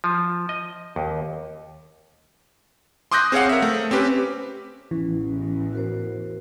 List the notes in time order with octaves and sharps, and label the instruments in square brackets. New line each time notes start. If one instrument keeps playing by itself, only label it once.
[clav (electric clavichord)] F3
D#5
D#2
[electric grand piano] C6 D6 D#6 F#6 G6 A#6
C4 G#4 C#5 F5 F#5
A#4 E5
A3
C4 C#4 G4 B4
[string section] A1 E2 [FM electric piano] E3 [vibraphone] C#4
[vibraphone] F#4 A#4 C5